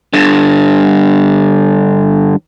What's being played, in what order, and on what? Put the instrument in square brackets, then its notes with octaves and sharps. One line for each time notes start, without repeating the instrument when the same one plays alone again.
[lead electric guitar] G2 D3